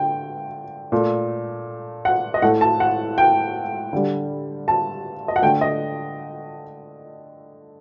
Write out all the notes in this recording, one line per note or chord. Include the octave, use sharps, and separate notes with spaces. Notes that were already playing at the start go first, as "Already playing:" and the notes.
Already playing: D3 G5
A#2 A3
F#5
D#5
A2 A3 F#5
A5
F#5
G5
D3 G3
A5
D#5
F#5
D3 A3 G5
D#5